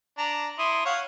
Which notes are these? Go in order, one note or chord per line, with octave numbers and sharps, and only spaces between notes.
D4 A#5
E4 C6 D#6
C#5 F5 F#5